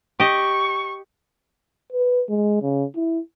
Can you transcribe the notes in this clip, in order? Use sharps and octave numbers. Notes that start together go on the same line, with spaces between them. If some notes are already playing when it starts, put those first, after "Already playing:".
G4 D#5 C#6
B4
G#3
C#3
E4